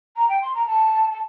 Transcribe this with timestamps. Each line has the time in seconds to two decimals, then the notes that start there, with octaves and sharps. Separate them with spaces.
0.17 A#5
0.29 G5
0.42 C6
0.55 A#5
0.67 A5
1.11 A5